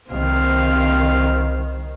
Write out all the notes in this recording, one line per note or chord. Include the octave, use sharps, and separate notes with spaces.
C2 D#3 C4 F5